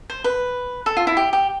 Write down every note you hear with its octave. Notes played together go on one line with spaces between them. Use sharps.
C5
B4
A4
F4
E4
G4
G4